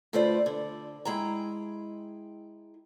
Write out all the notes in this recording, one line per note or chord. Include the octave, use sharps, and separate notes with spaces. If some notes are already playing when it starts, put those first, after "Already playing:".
D2 A3 F4 B4 C5 D5
D3
G#3 E4 G#4 G5 A#5